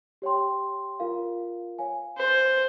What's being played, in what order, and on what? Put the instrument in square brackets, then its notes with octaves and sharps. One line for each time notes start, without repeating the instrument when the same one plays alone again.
[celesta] G4 C#5 G5 C6
F4 A#4 F5
C#5 F5 G#5
[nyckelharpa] C5